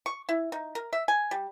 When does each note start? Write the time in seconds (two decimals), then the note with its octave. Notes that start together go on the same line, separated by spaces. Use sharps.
0.06 C#6
0.29 E4
0.52 D#4
0.75 A#4
0.93 E5
1.08 G#5
1.31 G3